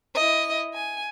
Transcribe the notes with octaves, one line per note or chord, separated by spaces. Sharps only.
E4 D#5
G#5